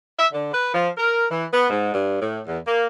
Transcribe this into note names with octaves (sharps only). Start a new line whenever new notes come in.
E5
D3
B4
F3
A#4
E3
B3
G#2
G2
A2
E2
A#3